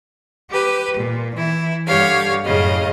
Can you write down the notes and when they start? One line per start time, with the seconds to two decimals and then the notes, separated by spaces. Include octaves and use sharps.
0.50 G4 B4
0.96 A#2
1.35 E3 E4
1.86 G2 D3 G4 C#5 F5
2.44 F#2 A2 C#3 D#5 F5